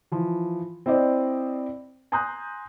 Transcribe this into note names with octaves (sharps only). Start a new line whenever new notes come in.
E3 F3
C4 E4 C5 D5 D#5
G#5 A#5 C6 D#6 F#6 G6